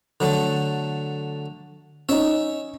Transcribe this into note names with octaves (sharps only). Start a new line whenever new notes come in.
D3 F#3 A3
C#4 D#4 C#5 E5